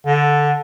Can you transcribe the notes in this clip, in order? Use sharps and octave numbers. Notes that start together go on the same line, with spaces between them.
D3